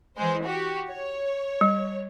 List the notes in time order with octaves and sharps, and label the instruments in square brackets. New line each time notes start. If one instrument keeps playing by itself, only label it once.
[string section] E3 G#3 C5
F#4 G4
C#5
[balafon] G3